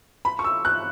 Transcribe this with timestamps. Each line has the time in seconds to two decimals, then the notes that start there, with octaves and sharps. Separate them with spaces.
0.25 B5
0.39 C#6
0.44 E6
0.65 F#6